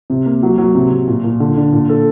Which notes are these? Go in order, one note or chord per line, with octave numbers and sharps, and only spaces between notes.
C3
A#3
F#3
F#3
C3
C3
A#2
A#2
D3
D4
A#2
A4